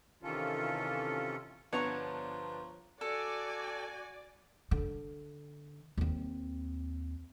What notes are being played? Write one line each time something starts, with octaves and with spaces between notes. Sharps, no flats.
C3 D#3 E3 C#4 F4 A4
G1 F3 B3 D4 C#5 A#5 C#6
F#4 A4 D5 G#5
D3
D#2 C4